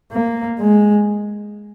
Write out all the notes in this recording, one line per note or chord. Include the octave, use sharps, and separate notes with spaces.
A#3
G#3